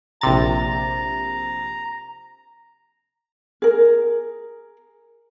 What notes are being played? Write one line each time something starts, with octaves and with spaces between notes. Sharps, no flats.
A#1 C3 A#5 A6
G#4 A#4